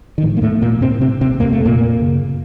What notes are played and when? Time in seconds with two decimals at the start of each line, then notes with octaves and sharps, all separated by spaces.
0.18 D#3
0.22 A2 F3
0.37 A#3
0.42 A2 A3
0.62 A#2 A#3
0.81 A2 C3 C4
1.01 C3 C4
1.21 C3 C4
1.40 F2 C3 A#3
1.53 A3
1.65 A#2 A#3
2.00 F#2 C#3